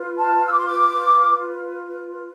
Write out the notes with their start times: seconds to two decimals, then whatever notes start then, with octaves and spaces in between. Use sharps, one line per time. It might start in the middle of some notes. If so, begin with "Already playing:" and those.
Already playing: F4 B4
0.17 A5
0.45 E6
0.52 D6
0.59 C6
0.66 D6